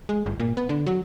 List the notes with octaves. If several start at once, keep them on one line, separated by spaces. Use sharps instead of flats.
G#3
G1
A#2
B3
D3
F#3